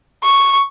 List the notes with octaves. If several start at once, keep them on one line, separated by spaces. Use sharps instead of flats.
C#6